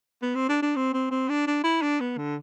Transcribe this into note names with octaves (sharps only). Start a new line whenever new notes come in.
B3
C4
D4
D4
C4
C4
C4
D4
D4
E4
D4
B3
D3